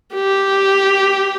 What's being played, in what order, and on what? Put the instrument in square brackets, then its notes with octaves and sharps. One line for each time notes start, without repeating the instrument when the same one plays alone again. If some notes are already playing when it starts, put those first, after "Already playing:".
[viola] G4